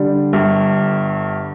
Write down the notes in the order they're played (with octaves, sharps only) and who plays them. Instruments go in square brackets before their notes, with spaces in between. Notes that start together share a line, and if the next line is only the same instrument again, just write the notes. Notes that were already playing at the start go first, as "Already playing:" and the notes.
Already playing: [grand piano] D3 G3 D4
[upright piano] G1 G2